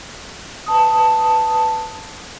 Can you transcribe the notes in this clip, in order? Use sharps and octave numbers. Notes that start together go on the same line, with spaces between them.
B4 A5 D#6